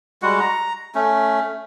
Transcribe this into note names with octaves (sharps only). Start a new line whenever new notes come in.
G3 G#3 F#4 F#5
A#5
A3 C#4